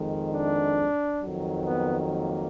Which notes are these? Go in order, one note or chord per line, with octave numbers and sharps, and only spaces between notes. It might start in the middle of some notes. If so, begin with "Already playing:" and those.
Already playing: F2 D#3 G#3
D4
F2 D#3 F#3
B3
A#3